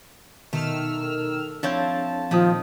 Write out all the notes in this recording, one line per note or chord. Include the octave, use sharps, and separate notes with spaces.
B2 D#3 A3 E6 F6
F3 C4 D4 E4 C#5 A5 G6
A#2 D#3 F3 G4 A5 D#6